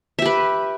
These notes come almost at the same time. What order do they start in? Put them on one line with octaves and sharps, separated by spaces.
E5 G4 B4